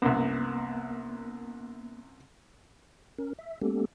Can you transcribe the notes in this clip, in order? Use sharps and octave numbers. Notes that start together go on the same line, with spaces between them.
C2 F#2 A#3 B3
C#4 A#4
E5
G#3 A#3 B3 C#4 G4 A4